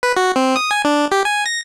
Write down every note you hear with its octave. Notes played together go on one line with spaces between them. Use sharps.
B4
F#4
C4
D#6
G#5
D4
G4
G#5
A#6